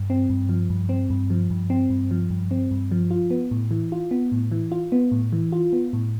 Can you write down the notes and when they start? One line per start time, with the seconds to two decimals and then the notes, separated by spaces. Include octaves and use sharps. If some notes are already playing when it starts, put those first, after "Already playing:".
Already playing: G2
0.10 C4
0.30 G2
0.49 F3
0.70 G2
0.89 C4
1.10 G2
1.30 F3
1.50 G2
1.70 C4
1.90 G2
2.11 F3
2.30 G2
2.51 C4
2.71 G2
2.91 F3
3.11 F4
3.30 B3
3.51 A2
3.71 E3
3.92 F4
4.11 B3
4.32 A2
4.51 E3
4.72 F4
4.92 B3
5.12 A2
5.32 E3
5.52 F4
5.73 B3
5.93 A2